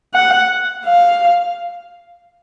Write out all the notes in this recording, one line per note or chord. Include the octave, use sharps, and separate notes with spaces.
F#5
F5